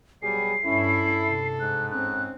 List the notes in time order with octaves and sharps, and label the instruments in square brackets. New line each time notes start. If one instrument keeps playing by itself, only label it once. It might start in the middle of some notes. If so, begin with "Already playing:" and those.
[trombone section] B2 F#3 G3 [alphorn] G#4 [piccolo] C7
[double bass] G2 C#4 [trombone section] E4 [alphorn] A4
[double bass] C3
[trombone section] G#2 [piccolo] F#6
[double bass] C4 C#4 [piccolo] F#6